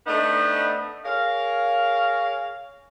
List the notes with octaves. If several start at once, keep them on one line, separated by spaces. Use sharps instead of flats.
A3 B3 C4 D4 D#4 D#5
G#4 A#4 C#5 F5